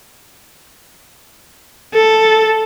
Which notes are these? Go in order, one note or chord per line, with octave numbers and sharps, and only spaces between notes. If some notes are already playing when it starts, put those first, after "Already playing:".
A4